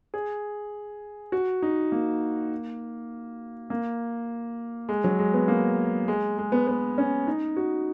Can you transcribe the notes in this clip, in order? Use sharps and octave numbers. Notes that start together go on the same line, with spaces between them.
G#4
F#4
D#4
A#3
A#3
G#3
F#3
G#3
B3
A#3
G#3
G#3
B3
B3
C#4
D#4
F#4